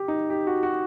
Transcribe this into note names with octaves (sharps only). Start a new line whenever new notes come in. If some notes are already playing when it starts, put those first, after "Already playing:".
Already playing: G4
D#4
G4
F#4
F#4